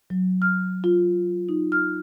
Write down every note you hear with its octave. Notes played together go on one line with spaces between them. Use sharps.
F#3
F6
F4
D#4
F6